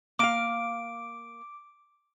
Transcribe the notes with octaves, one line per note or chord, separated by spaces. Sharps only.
A#3 F5 D6 D7